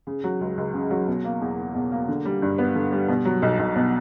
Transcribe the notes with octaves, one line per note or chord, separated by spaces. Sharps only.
C#3
F#3
C#2
C#2
C#3
F#3
B2
A#3
E2
E2
B2
A#3
D3
G3
G2
B3
D3
G3
B2
F#3
B1
B1
B2